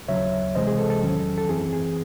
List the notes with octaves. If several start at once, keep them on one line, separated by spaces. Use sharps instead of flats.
D#2 C#3 F#3 C#5 E5
C2 C3 E3 G#3 C5 D#5
G#4
A4
A4
E2 D#3 F#3 C#4
A4
F#2 E3 C4 G#4
G#4